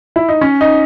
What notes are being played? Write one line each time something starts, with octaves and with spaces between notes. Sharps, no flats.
E4
D#4
C#4
D#4